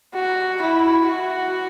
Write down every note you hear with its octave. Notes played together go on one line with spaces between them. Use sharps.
F#4
E4
F#4